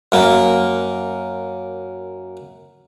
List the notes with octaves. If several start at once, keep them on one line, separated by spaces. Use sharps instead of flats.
F#2 A#3